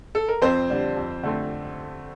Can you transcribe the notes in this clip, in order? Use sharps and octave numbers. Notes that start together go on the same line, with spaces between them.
A4
A#4
F2 C4 C5
D3 G3 D4
F2
D3 A3 C4